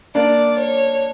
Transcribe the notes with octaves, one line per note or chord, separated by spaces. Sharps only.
A#3 D4 D5
C#5